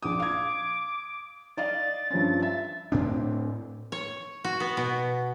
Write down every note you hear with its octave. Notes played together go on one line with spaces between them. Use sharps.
A#1 D6 D#6
F5 G#6
D5 D#5 F5 A6
G2 F3 C#4
E5 A6
A2 C4 D4
C#5
F#4
B3
B2